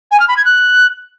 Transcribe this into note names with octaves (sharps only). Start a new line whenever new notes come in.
G#5
F6
B5
G#6
F#6